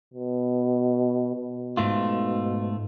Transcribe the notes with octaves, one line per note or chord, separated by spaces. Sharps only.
B2
B2
G#2 A3 F4